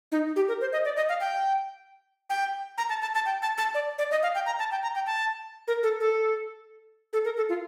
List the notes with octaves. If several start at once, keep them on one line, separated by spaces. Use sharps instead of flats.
D#4
G4
A#4
C5
D#5
D5
D#5
F5
G5
G5
A#5
A5
A5
A5
G5
A5
A5
D5
D5
D#5
F5
G5
A#5
A5
G5
A#5
G5
A5
A#4
A4
A4
A4
A#4
A4
F4